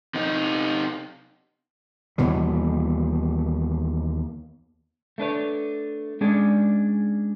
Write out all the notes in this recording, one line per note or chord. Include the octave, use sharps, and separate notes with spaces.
C3 D#4
D#2 B2 E3 G3
A3 D4 B4 C#5
G#3 C#4 D4 G#4 D5